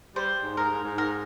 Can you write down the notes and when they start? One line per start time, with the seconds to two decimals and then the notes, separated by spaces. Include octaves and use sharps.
0.16 G3 C5
0.43 G#2
0.57 G#2 A#4
0.71 G#2
0.84 G#2
0.98 A#4